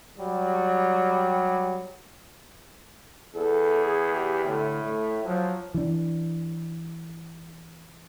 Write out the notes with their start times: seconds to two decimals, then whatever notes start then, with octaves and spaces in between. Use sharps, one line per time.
0.18 F#3 G3
3.35 E2 A4
3.83 G#4
4.15 G4
4.46 A2 D3
4.83 A3
5.25 F3 F#3
5.74 E3 D4